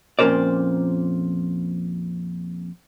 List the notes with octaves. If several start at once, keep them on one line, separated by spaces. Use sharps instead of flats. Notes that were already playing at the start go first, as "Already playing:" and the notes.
F2 A#2 C#4 A#4 C5 D5